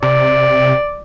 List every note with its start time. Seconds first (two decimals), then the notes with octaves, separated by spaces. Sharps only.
0.02 C3 D5